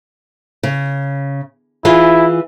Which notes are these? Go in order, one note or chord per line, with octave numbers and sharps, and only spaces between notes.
C#3
E3 E4 F4 G#4